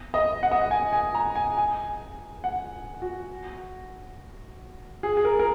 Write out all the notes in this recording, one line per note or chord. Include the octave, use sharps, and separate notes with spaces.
D#5
F#5
D#5
F#5
G#5
G#5
A#5
G#5
G#5
F#5
F#4
G#4
G#4
A#4
A#4